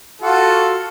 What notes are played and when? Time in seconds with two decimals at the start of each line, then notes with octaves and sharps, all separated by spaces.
0.21 F4 F#4 A4